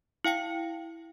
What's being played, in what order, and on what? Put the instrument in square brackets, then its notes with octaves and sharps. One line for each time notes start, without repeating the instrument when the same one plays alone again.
[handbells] E4 F5 G5 C#7